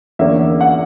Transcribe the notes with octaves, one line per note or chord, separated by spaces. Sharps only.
E2 D3 A#3 C#4 E5
F#5